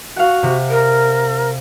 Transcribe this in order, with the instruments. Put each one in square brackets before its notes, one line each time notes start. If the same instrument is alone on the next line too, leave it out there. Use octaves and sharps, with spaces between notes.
[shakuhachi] F#4 [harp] F5 F#5
[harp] C3
[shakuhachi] A#4